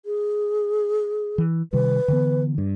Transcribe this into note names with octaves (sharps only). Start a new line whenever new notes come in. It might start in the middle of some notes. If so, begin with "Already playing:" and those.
G#4
E3
C3 D#3 G3 B4
D3 E3 B3
G2